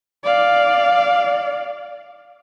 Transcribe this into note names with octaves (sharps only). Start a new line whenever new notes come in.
D5 F5